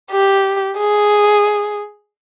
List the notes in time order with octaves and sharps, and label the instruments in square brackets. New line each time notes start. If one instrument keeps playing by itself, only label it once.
[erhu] G4
G#4